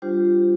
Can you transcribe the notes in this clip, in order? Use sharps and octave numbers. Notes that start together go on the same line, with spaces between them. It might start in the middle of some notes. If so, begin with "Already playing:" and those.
G3 D4 F4 G4 C5
G4
G4